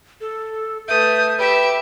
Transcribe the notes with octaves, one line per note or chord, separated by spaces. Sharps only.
A4
A3 B4 E5 D#6 G6
G4 B4 E5 B5